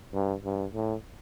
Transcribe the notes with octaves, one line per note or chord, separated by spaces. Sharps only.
G2
G2
A2